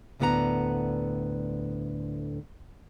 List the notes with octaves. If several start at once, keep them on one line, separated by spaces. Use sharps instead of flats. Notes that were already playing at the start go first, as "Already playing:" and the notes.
D2 A2 D3 B3 F#5 A#5